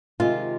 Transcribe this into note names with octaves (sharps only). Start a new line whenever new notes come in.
C3 D#3 G#3 F4